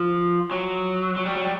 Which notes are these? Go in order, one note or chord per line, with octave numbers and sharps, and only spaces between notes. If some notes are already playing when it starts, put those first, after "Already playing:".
Already playing: F3
F#3
F#3
G3
F#3
G3